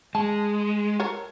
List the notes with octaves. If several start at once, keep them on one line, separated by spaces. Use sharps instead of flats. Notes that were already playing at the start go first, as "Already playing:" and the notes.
G#3 A5
A4 A#4 C#5